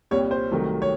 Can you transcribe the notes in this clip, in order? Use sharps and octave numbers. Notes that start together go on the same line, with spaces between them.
C2 A#2 G3 C#5
C5
C2 C3 D#3 F#3 A3
C#5